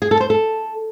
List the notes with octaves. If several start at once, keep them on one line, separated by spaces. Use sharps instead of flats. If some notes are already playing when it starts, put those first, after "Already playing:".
G#4
A4
C5
A4